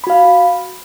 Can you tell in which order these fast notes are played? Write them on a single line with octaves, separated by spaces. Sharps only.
B5 F#4 F5